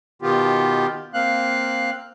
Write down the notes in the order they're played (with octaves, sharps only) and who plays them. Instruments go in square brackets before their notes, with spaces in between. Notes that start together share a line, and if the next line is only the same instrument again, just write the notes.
[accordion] B2 D#3 B3 F4 G4
A#3 C4 F5 F#6